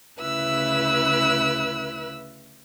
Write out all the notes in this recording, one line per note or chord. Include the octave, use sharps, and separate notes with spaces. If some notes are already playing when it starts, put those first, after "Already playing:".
D2 C#3 E4 B4 E6 F#6